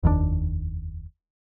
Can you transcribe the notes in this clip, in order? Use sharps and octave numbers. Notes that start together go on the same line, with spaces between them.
F1 D#2 C3 D4